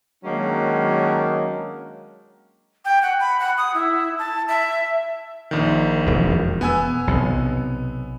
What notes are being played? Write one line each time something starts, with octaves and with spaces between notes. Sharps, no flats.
D#3 F#3 G#3 A#3 C#4 D4
G5
F#5
B5
F#5
D#6
E4
A5
E5
A#1 D#3
E1 F2
B3 G#5 E6
B1 C3